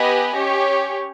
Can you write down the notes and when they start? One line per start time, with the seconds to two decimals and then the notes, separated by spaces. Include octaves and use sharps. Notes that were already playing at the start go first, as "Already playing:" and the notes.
Already playing: B3 G4 B4 D#5 G#5
0.35 C#4 G4 C#5